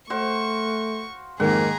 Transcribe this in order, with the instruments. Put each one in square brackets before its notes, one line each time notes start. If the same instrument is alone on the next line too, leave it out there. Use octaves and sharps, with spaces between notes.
[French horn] A3 [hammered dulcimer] F#4 C5 F5 [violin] C#6
[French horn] F2 [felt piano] G#2 D#3 A#3 [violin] G#4 A#5 [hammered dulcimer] F#5